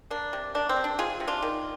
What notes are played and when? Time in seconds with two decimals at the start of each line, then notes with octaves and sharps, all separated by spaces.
0.10 A#3 D4
0.33 C3
0.55 A#3 D4
0.69 C4
0.76 C3
0.84 D4
0.99 G#3 F4 G#4
1.20 C3
1.27 D4 F4
1.43 D#3